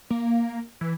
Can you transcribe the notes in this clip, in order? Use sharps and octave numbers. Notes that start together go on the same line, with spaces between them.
A#3
E3